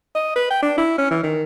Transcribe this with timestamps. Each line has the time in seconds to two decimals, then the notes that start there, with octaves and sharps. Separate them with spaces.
0.15 D#5
0.36 B4
0.50 G5
0.62 D4
0.78 E4
0.98 C#4
1.11 E3
1.24 D#3